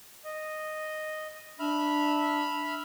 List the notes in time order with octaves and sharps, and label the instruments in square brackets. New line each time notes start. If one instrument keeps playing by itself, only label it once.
[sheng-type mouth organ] D#5
[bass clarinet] D4 [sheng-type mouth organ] E5 B5 F6